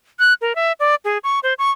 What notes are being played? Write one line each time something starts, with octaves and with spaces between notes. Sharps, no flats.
F#6
A#4
E5
D5
G#4
C#6
C5
C#6